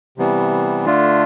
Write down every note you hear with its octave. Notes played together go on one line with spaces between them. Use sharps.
C3 E3 G3 B3
D3 A3 D4 F4